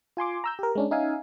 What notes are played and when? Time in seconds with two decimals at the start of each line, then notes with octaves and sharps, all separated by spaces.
0.17 F4 G#5 C6 D6
0.44 A#5 E6 G6
0.59 G4 A#4
0.75 G#3 C#4 D4
0.91 C#4 D#4 E5 F5 G#5